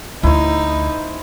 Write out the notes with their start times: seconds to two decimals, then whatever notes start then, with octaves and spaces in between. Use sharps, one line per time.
0.23 D2 D#4 E4 C5